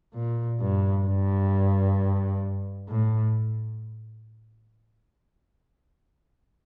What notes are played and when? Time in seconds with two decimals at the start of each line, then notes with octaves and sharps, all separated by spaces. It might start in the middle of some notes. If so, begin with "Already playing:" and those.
0.14 A#2
0.60 G2
1.06 G2
2.88 A2